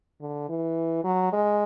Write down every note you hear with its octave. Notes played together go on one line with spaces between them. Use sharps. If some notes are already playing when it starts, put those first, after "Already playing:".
D3
E3
F#3
G#3